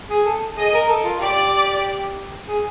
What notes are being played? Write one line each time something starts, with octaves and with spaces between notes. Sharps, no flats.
G#4
A4
G#4 D#5
A#4
A4
F4
G4 D5
G#4